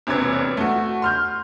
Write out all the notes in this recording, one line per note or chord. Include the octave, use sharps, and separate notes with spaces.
E1 A#1 C3 C#4 B4 G#6
A3 F#4
C6 F6 G6